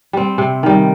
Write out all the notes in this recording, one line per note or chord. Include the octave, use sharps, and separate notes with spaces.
G3 C4
C3
D#3 G3